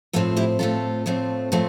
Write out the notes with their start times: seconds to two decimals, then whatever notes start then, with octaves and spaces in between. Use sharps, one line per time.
0.13 A2 F3 A3 C4 F4 A4
0.37 E4 G4
0.59 A2 F3 A3 C4 F4 A4
1.06 A2 F3 A3 C4
1.52 A2 F3 A3 C4